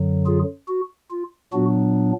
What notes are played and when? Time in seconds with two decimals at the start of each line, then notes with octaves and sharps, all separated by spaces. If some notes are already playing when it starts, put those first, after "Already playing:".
Already playing: F#2 D3 F#3
0.26 F4 G#4
0.68 F#4
1.11 F4
1.53 A#2 F#3 B3 D4 F#4